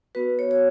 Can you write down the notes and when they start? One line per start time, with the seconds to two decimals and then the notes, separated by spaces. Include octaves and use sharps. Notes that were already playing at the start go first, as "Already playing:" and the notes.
0.15 B3 F#4 B4
0.39 C#5
0.51 C#5